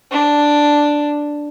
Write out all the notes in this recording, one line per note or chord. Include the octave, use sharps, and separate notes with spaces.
D4